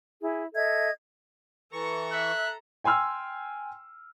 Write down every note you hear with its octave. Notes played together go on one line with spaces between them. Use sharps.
E4 G#4
A4 D#5 E5 G#6
E3 A4 A#5 C#6
E5 F#6
G5 G#5 C6 E6 F6